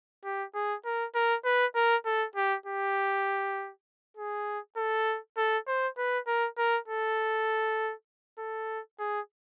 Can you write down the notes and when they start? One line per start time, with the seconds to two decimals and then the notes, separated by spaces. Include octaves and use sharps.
0.24 G4
0.54 G#4
0.85 A#4
1.15 A#4
1.45 B4
1.75 A#4
2.05 A4
2.35 G4
2.66 G4
4.17 G#4
4.77 A4
5.37 A4
5.67 C5
5.98 B4
6.27 A#4
6.58 A#4
6.88 A4
8.38 A4
8.99 G#4